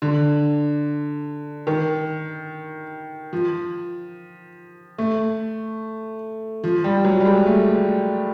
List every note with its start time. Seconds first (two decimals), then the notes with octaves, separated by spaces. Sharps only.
0.02 D3
1.67 D#3
3.33 F3
4.98 A3
6.64 F3
6.84 G3
7.05 F#3
7.20 G3
7.25 G#3
7.46 A3